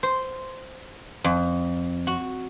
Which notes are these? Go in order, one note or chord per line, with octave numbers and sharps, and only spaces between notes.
C5
F2
F#4